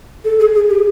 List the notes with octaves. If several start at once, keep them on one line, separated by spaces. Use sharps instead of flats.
A4
G#4
G#4
G4